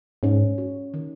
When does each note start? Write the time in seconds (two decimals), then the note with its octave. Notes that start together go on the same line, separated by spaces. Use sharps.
0.23 G#2 C#4
0.58 F#4
0.94 D#3